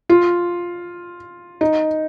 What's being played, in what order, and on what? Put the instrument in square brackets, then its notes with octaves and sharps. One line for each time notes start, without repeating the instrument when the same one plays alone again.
[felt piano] F4
D#4